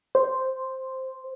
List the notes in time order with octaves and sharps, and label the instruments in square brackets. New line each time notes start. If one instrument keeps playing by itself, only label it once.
[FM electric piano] C5